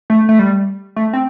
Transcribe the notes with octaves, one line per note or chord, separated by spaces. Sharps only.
A3
A3
G3
A3
C4